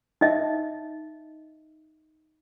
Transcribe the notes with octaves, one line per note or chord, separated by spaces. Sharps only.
D#4 D#5 E5